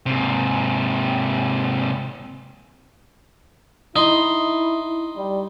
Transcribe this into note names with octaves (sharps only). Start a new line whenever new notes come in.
G#2 C3
D#4 E4 C6
G3